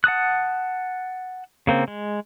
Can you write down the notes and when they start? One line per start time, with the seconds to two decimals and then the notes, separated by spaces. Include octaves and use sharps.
0.04 F#5 A5 D#6 F#6
1.67 C#3 A#3 C4
1.88 G#3